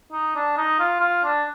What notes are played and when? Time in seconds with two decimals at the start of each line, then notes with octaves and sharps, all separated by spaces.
0.12 D#4
0.35 D4
0.57 D#4
0.79 F4
1.01 F4
1.24 D4